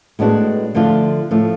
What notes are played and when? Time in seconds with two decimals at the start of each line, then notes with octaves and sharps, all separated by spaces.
0.19 A2 G#3 B3 D4 F#4
0.75 D3 F3 A3 D4 F4
1.31 A2 F3 A3